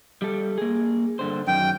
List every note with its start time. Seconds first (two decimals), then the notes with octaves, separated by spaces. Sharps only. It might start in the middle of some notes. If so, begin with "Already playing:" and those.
0.22 G3 A4
0.58 A#3 G#4
1.19 G2 D3 C5
1.47 F#2 D#3 G5